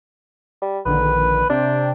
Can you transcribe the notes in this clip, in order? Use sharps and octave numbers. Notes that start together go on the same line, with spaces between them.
G3
A#1 D3 D#3 B4
C3 D4 G5